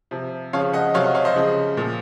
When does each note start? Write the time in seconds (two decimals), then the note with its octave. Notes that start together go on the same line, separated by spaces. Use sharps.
0.11 C3 F3
0.53 C#3 F3 C#5 F5
0.73 D#5 F#5
0.94 C3 F#3 C#5 F5
1.04 D#5 F#5
1.15 C#5 F5
1.25 C5 D#5
1.36 C#3 F3
1.77 A#2 F3